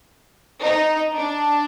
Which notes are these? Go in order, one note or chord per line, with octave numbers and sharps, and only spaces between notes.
D#4
D4